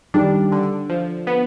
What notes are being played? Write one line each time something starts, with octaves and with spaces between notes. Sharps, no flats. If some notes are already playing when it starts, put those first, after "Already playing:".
D#3 G3 D4
D3
F3
B3